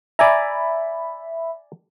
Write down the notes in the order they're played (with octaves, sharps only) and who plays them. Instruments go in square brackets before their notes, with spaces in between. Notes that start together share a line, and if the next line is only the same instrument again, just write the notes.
[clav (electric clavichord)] D5 G#5 A#5 [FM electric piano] E5 B5